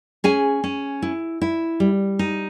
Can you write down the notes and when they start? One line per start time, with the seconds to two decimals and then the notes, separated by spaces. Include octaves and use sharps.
0.24 C#4 G#4 G#5
0.64 C#4
1.02 E4
1.41 E4
1.80 G3
2.19 D#4